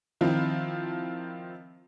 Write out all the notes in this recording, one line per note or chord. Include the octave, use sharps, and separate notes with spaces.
D#3 F3 C4 E4 F4